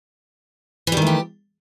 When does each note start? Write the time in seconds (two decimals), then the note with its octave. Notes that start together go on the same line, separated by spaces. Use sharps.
0.87 E3
0.92 G3
0.97 D#3
1.02 A3
1.07 G4